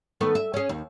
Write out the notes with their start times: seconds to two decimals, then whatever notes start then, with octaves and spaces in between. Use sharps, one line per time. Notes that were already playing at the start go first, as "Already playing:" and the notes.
0.21 D#3 A3 B3
0.35 E5
0.54 C#4 G#4
0.69 D#2